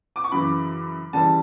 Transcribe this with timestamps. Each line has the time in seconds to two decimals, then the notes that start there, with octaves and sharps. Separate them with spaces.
0.16 D6
0.24 C#6
0.32 F#2 C#3 E3 B5
1.13 C#3 E3 G3 A5